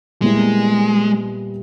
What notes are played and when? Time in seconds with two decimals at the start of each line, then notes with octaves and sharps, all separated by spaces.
0.22 A#2 G3 G#3 B3 E4